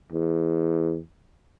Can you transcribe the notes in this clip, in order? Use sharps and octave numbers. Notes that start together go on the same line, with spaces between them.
E2